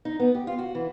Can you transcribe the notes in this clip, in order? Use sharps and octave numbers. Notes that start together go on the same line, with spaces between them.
D#4
B3
G4
F4
F#4
E3